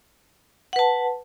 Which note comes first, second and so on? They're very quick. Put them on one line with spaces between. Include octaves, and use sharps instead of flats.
F#5 B4 A5